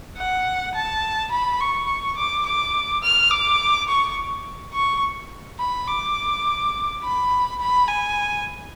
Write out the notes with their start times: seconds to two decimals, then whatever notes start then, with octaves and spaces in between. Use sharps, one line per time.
0.18 F#5
0.75 A5
1.31 B5
1.60 C#6
2.17 D6
2.46 D6
3.03 F6
3.31 D6
3.88 C#6
4.74 C#6
5.59 B5
5.88 D6
7.02 B5
7.60 B5
7.88 G#5